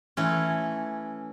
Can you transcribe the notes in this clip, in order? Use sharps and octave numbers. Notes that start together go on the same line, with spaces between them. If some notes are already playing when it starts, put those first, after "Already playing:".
E3 A3 C#4